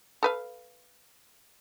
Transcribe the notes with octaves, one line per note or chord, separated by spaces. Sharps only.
A4 B4 F5